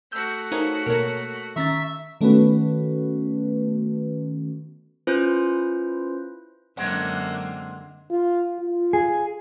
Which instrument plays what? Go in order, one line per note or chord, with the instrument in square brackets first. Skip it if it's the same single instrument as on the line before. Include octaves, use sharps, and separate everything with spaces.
[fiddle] A3 F#4 [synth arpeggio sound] E6 G6
[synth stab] D#4 G#4 C#5 [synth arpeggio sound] A#4 C5 F5
[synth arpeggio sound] B2 A#3 [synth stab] A#4 C#5
[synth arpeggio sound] D#3 C#4 A6 [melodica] E5 [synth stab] A#5 C#6
[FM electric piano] D#3 A3 B3 C#4 F#4 B4
[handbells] C#4 E4 F4 B4 C5
[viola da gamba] F#2 D3 A#3 [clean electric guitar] G#3 C4 [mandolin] F#5
[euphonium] F4
F4
[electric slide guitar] G#4